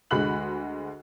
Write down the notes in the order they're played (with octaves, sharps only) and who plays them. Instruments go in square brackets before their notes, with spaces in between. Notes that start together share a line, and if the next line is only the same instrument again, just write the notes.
[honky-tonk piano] D2 G#3 F#4 B5 F#6 F#7